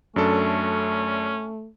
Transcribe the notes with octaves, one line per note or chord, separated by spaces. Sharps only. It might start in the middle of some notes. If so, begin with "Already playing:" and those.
F#2 A3 C#4 D4 A4